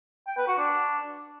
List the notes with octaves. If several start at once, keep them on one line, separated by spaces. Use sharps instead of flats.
G5
B4
F#4
D4